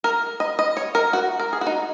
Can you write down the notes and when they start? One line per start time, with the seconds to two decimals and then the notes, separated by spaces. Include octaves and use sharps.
0.04 A#4
0.40 D#5
0.59 D#5
0.77 C#5
0.95 A#4
1.13 F#4
1.40 A#4
1.53 G#4
1.61 F#4
1.67 D#4